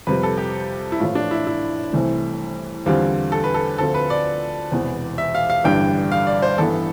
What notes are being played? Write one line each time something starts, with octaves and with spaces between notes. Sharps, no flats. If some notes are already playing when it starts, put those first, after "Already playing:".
F2 C3 G3 B4
A4
G4
E4
A1 A2 F3 A3 F4
D4
E4
E4
C2 C3 E3 A3 C4
E2 D3 G3 C4 F4 G4
A4
B4
A4
D2 D3 F3 C4 F4 A4
B4
D5
E1 E2 C3 E3 B3
E5
F5
F5
A1 G2 D3 G3 D4 G5
F5
D5
C5
A1 G2 E3 B3 E4 A4